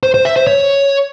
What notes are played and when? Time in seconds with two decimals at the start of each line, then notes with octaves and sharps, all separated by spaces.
0.03 C5
0.14 C5
0.25 E5
0.36 C5
0.47 C#5